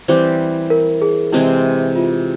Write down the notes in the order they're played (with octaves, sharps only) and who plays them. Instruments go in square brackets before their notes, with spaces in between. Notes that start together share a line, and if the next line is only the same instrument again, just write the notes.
[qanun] E3 G3 C4 G4 [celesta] C5
[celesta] A#4
G#4
[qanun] C3 E3 G#3 C4 [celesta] E4
[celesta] F4